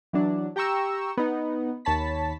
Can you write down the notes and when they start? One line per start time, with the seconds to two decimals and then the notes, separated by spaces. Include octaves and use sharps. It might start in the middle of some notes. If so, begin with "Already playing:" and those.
0.13 E3 F#3 D4
0.56 G4 G5 A#5 C#6 E6
1.17 B3 D#4
1.85 D#2 C#5 A5 B5 B6